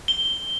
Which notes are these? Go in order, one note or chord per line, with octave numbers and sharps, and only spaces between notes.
G7